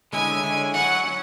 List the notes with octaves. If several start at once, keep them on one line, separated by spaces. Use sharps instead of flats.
D3 G#3 C#4 E4 G#5
D3 G#3 C#4 E4
F#3 C#4 F#4 B4 F#5
F#3 C#4 F#4